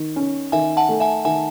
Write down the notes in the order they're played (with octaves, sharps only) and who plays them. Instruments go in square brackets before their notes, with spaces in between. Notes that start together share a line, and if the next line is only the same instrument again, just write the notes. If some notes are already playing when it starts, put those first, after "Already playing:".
Already playing: [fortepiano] D#3
C#4
[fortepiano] D#3 [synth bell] E5 G#5
[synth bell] F#5 A5
[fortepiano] A3
[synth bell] E5 G#5
[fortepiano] D#3 [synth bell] E5 G#5